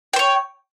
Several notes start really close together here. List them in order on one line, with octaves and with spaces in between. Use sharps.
G5 C5 C#5